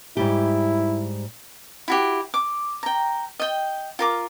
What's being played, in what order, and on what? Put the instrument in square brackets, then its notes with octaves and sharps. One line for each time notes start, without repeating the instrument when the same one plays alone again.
[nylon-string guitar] G#2 G3 G4 [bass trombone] E4
[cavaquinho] E4 F#4 G4
D6
G5 A#5
D#5 G5
F4 A#4 D6